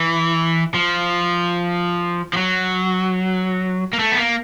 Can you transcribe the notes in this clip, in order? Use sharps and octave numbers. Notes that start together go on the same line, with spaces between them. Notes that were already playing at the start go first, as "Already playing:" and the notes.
Already playing: E3
F3
F3
F#3
A#3
A3
B3
A#3